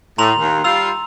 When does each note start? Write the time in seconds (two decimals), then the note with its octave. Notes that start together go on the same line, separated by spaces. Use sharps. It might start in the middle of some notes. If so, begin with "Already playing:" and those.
0.18 A2 A#5 C6 F7
0.38 D#2
0.64 G3 F4 E6 F7